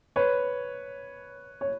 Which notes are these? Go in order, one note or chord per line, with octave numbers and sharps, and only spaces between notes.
B4 C#5
C#5